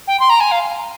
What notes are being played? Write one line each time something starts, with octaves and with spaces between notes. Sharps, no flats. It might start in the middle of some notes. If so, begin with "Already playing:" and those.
G5
C6
A#5
G#5
F5